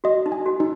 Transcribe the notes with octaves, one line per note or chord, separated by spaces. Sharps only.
F#4 D#5
D#4
G#5
F#4
D#4